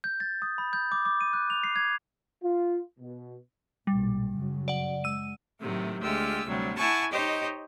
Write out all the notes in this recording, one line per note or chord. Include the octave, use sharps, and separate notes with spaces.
G6
A6
D#6
B5
G6
D6
D6
D#7
F#6
F7
C7
G#6
F4
B2
B1 A#2 G3
F#2 C#3 F#3
D5 F#5
G#3 E6 D#7
A2 C3 D#3 F#3 A3
D2 G#3 F4 G4 E6
D2 C3 F#3 G3
E4 F#5 G#5 A5 C#6
D#4 G4 C5 C#5 D#5